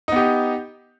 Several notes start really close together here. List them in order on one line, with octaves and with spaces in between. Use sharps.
D#4 B3 G4